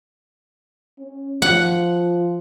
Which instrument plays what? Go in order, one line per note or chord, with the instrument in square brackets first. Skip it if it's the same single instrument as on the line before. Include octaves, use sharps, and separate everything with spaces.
[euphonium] C#4
[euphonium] F3 [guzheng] F#5